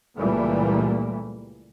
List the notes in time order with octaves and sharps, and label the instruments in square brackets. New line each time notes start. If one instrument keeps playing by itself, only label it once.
[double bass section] C#2 A#2 E3 G3 A3 A#3